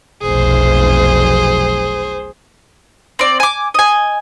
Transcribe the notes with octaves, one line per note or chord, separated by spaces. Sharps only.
F1 B1 G#4 C5
C4 D5
G#5 D6
D#5 G#5